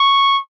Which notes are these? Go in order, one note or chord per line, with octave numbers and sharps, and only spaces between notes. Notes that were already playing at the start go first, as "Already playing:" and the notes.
Already playing: C#6